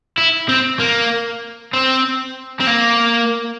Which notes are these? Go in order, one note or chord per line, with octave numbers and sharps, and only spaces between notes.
E4
C4
A#3
C4
C4
A#3